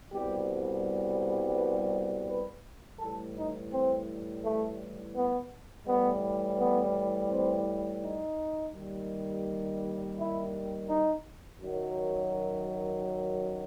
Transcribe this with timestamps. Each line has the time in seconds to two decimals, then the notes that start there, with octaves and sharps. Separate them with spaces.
0.13 C2 B2 G3 G4
1.56 B4
2.28 B4
2.99 A2 E3 G3 A4
3.36 D#4
3.72 C4
4.44 A3
5.15 B3
5.87 A2 E3 G3 B3
6.59 B3
7.31 C4
8.02 D#4
8.74 D#2 D#3 G3
10.18 E4
10.89 D#4
11.61 F#2 D#3 F#3